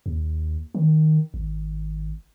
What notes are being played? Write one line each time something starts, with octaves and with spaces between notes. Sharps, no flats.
D#2
D#3
G#1